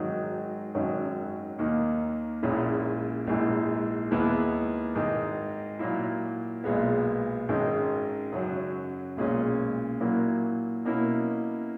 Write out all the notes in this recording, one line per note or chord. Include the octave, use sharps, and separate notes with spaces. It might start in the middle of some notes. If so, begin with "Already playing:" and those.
Already playing: G#1 G#2 D#3 F#3
G#1 F#2 D#3 F#3 C#4
D#2 D#3 A#3
A#1 A#2 G#3 C#4 E4
A#1 G#2 E3
D#2 D#3 G#3 B3 E4
G#1 G#2 D#3
A#2 F#3 A#3 E4
B1 A#2 G#3 B3
G#1 G#2 D#3 G#3 C#4
F#2 C#3 F#3
B1 A#2 G#3 C#4
A#2 F#3 A#3 E4
B2 A#3 C#4 E4